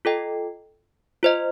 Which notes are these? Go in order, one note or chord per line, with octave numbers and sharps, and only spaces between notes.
F4 A4 D#5 G5
F4 C5 D#5